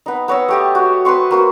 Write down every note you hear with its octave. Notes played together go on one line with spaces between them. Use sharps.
B3 D#4
B3 C#5 D#5 E6
A3 G4 D#5
F#4
B4 C5 C6 C#6
A#3 F#4 C5